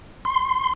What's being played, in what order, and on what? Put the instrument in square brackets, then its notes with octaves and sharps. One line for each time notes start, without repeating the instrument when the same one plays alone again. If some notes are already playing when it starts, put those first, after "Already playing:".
[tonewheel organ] C6